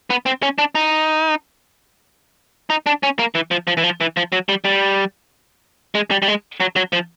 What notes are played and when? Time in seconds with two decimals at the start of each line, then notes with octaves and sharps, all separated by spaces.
0.10 B3
0.26 C4
0.43 C#4
0.58 D4
0.75 D#4
2.70 D#4
2.86 D4
3.03 C#4
3.19 A#3
3.35 E3
3.51 F3
3.67 F3
3.77 E3
3.84 F3
4.01 E3
4.17 F3
4.32 F#3
4.49 G3
4.65 G3
5.95 G#3
6.11 G3
6.22 G3
6.28 G#3
6.60 F#3
6.76 F#3
6.93 F3